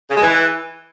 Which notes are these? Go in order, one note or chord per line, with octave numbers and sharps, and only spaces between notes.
C#3
G#3
E3